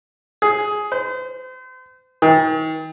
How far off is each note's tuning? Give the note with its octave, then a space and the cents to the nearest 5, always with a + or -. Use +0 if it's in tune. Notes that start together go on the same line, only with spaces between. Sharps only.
G#4 +10
C5 -40
D#3 +35